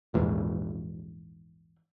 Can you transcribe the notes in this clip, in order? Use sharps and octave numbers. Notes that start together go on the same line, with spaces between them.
A#1 E2 G#2